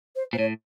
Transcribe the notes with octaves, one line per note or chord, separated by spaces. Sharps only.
C5
A#2 C5
A2 C#5